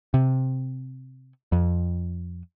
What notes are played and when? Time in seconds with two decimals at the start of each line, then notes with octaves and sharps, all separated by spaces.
0.14 C3
1.52 F2